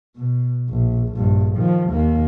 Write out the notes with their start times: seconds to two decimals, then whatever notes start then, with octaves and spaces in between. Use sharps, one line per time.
0.16 B2
0.69 A#1
1.13 A#1 G2
1.56 D#3 F3
1.89 D#2 A#3